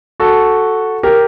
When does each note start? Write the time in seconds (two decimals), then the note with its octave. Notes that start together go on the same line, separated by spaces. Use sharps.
0.20 F#4 A4
1.03 G4 A#4